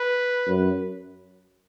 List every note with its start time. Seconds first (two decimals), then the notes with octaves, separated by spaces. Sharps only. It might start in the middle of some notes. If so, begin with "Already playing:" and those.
Already playing: B4
0.47 F#2